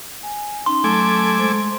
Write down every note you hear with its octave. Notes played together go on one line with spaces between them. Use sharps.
G#5
C#4 D#4 C6
F#3 A3 G#5 A5 D6
G#3 C5